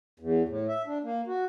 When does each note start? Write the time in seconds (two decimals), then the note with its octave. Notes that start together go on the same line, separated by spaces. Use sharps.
0.19 E2
0.49 A2
0.68 E5
0.86 D4
1.04 A#3
1.27 F#4